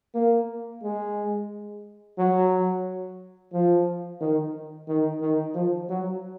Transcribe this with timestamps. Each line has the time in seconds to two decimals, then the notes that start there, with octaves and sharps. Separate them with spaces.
0.15 A#3
0.83 G#3
2.18 F#3
3.53 F3
4.21 D#3
4.88 D#3
5.21 D#3
5.55 F3
5.89 F#3